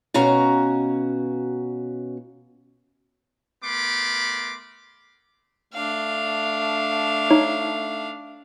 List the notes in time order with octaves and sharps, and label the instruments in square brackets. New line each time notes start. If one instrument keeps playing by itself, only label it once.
[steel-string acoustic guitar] B2 C#4 F#4 F5 A#5
[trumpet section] A3 B3 A#4 B5 C6 D6
[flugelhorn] A3 [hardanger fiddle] D4 F5
[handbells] D#4 C#5